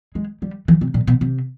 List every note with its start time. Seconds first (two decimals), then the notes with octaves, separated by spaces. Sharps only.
0.15 G#3
0.42 G3
0.68 E3
0.81 C3
0.94 A#2
1.07 B2
1.21 C3